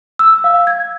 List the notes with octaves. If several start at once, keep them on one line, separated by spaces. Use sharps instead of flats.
E6
F5
G#6